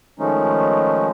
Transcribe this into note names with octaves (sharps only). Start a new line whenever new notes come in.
D#3 F3 G#3 A3 C#4 D#4